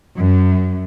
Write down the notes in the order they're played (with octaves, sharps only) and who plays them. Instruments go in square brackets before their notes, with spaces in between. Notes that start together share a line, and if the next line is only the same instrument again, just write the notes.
[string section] F#2